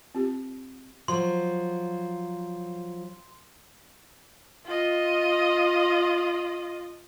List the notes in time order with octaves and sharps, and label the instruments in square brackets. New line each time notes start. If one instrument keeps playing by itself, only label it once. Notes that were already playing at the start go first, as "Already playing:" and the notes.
[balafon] C4 F4 G4
[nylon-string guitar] F3 F#3 [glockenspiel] C6
[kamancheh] F4 D#5